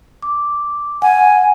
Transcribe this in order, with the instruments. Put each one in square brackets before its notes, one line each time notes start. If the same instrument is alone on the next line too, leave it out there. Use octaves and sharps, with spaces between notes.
[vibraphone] D6
[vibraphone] F#5 [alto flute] G#5